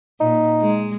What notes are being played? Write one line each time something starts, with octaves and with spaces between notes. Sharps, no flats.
A#2 D#4
G#3